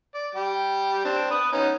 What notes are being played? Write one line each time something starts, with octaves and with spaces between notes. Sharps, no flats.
D5
G3 G4
C4 D4
B4 D#6
B3 C#4 D#4